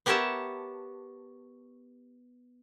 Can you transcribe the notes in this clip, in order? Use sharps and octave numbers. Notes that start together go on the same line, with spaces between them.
B3 G4 A#4 C#5 E5 A5